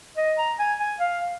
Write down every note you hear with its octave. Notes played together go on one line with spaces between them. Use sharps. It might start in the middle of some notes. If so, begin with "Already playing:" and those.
D#5
A#5
G#5
G#5
F5